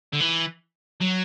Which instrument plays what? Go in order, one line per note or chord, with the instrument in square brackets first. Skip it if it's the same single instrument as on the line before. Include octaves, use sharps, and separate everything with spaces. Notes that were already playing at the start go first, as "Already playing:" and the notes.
[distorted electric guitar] D3
E3
F#3